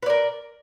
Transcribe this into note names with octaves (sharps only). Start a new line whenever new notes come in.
A#4 B4 D5